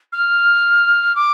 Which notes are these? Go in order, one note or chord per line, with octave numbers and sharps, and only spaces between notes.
F6
D6